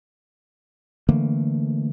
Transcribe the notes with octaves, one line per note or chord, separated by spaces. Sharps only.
D3 E3 A3 A#3